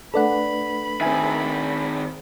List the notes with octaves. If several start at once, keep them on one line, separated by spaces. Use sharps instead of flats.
A3 D4 A4 B4 D5 F#5 B5
D#3 C4 E5 G#5